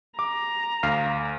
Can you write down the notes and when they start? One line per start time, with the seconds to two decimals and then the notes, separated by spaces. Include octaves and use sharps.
0.19 A#5 D6
0.83 D2 F5